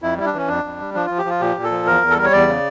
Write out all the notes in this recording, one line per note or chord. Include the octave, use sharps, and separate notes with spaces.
F2 E4
G3 E4
D4
E3 C#4
F2 D4
F2
G3
F3 D4
F3 F4
G4
F3 F4
A#2 G4
A#2
A4
F3
E2 A#4
E2
A4
G3 A#4
C#5
E2 D5
C#3